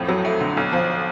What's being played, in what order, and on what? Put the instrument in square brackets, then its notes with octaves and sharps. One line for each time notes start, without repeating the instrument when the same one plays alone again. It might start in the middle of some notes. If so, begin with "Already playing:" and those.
Already playing: [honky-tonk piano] F2 A2
F#3
A3
D3
B1
F3